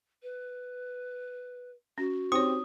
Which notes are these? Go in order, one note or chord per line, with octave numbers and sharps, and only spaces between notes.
B4
C#4 F#4
C4 D#4 G4 C#5 D#6